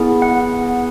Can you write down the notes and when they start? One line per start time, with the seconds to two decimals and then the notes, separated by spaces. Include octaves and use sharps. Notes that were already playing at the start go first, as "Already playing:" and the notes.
Already playing: B3 E4 G#4
0.22 F#5